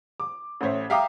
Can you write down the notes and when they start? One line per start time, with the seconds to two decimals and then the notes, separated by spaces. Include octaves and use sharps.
0.20 D6
0.61 A1 A3 C5 C#5 E5
0.90 E5 F5 G5 A#5 D6 D#6